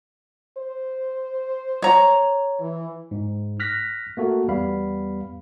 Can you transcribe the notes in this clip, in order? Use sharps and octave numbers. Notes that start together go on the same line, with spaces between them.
C5
C#5 A#5
E3
G#2
F6 F#6 A#6 B6
A3 A#3 F#4 A4
E2 G3 B3 F5 B5